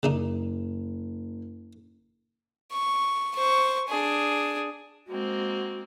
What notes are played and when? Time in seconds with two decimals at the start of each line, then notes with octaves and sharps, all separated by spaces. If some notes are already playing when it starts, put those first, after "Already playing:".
0.03 F#1 C#3 D4 D#4
2.72 C#6
3.35 C5 C#6
3.88 D4 G#4
5.07 G#3 A#3 C4 F#4